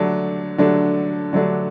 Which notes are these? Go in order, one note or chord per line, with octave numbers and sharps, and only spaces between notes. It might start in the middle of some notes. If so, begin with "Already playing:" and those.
Already playing: D3 F#3 A3 D4
D3 F#3 A3 D4
D3 F#3 A3 D4